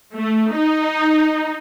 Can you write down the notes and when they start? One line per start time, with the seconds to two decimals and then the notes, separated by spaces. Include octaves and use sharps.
0.16 A3
0.57 D#4